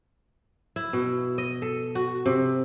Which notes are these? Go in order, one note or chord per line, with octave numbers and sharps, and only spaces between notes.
E4
B2
D#5
A4
F#4
C3